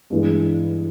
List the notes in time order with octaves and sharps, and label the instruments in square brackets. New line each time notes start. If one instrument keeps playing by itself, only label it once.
[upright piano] G2 E3 G#3